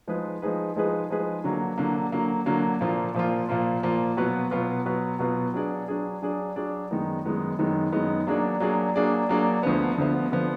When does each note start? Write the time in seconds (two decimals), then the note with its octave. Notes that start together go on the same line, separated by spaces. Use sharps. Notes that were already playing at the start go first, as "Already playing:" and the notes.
0.08 F3 G#3 D#4 G#4 B4
0.42 F3 G#3 D#4 G#4 B4
0.76 F3 G#3 D#4 G#4 B4
1.10 F3 G#3 D#4 G#4 B4
1.44 D3 F#3 A#3
1.78 D3 F#3 A#3
2.12 D3 F#3 A#3
2.46 D3 F#3 A#3
2.80 A#2 F3 A#3 F4
3.14 A#2 F3 A#3 F4
3.49 A#2 F3 A#3 F4
3.83 A#2 F3 A#3 F4
4.17 B2 F#3 B3 F4 B4
4.51 B2 F#3 B3 F4 B4
4.85 B2 F#3 B3 F4 B4
5.19 B2 F#3 B3 F4 B4
5.54 F#3 D4 G#4 D5
5.87 F#3 D4 G#4 D5
6.22 F#3 D4 G#4 D5
6.56 F#3 D4 G#4 D5
6.91 F#2 D#3 G#3 B3 D#4
7.25 F#2 D#3 G#3 B3 D#4
7.59 F#2 D#3 G#3 B3 D#4
7.92 F#2 D#3 G#3 B3 D#4
8.27 F#3 A#3 D4 G#4 D5
8.60 F#3 A#3 D4 G#4 D5
8.96 F#3 A#3 D4 G#4 D5
9.29 F#3 A#3 D4 G#4 D5
9.63 D2 D3 F3 B3
9.98 D2 D3 F3 B3
10.32 D3 F3 B3